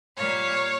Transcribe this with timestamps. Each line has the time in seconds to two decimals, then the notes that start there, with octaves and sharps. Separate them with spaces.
0.16 A#2 G3 A#3 C#5 F5